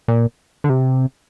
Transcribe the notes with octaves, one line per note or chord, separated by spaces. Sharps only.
A#2
D3
C3